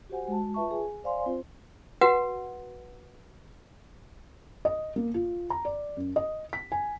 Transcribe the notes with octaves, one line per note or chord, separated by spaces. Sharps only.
F#4 G4 C5 F#5 G#5
G#3 F#4 A5
F4 B4 E5 A5 C#6
G#4 G#5
C5 D5 F5 G#5 C6
C4 F4 C5
F#4 B4 F#5
D#5
A#3
F4
A#5
D5
F#2
D#5
B6
G#5